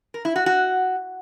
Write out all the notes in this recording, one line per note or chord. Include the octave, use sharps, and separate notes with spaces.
A#4
E4
F#4
F#4